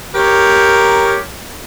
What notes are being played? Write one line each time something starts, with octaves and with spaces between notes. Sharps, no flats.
G4 A#4 C#5